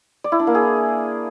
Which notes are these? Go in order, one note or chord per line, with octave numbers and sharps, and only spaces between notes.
D5
E4
D4
A#3
G#4